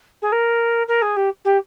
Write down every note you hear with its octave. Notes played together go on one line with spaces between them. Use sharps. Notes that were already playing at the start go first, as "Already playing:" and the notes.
G#4
A#4
A#4
G#4
G4
G4